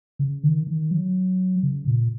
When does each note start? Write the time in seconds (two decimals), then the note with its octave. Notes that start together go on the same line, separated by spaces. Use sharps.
0.19 C#3
0.43 D#3
0.67 D#3
0.91 F#3
1.63 C#3
1.87 A#2